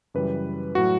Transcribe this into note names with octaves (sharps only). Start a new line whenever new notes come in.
F#2 C#3 E3 G3 B4
A2 F#3 F#4